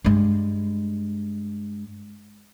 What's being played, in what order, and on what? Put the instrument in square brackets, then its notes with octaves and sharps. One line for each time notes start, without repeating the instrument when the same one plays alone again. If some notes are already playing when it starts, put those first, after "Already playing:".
[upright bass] G2 G#3